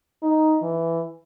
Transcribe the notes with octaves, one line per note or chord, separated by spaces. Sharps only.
D#4
E3